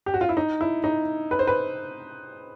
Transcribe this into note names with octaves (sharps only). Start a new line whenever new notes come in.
G4
F#4
F4
E4
D#4
E4
D#4
B4
C5
B4